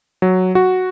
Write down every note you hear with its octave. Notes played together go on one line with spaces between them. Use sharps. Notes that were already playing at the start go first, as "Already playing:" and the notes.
F#3
F#4